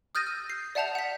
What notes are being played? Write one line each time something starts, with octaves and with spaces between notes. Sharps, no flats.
D#6 F6 G6 A6 A#6 D#7
E6
C7
D5 E5 F#5 A5 G6 F7
F#5 B6